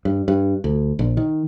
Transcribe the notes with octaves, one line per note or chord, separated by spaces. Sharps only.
G2
G2
D2
A#1
D#3